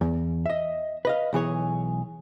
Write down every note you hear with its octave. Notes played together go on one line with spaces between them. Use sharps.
E2
D#5 E5
B4 D#5 F5
B1 E3 G#4 C#5